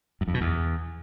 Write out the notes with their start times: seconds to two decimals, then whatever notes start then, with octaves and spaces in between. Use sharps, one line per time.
0.21 F#2
0.28 F2
0.34 B2
0.41 E2